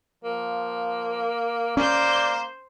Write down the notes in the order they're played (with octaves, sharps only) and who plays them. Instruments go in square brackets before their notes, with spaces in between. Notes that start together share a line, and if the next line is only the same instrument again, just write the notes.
[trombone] F3 [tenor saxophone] A#3
[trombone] A#3 [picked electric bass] C#4 [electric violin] C5 G6 [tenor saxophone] D5